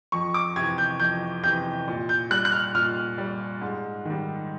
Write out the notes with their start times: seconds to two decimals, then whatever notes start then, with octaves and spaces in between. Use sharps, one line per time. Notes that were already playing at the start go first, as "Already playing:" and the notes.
0.12 F2 C#6
0.34 D6
0.56 C3 E3 G#6
0.78 G6
1.00 F2 G6
1.43 C3 E3 G6
1.88 A#2
2.09 G6
2.31 G3 F#6
2.45 F#6
2.52 F6
2.75 A#2 F6
3.18 G3
3.62 G#2
4.05 D#3 G3